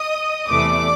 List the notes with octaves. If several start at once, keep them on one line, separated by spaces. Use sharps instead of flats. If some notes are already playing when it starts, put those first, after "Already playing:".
Already playing: D#5 D#6
E2 C3 E3 A3 D5 D6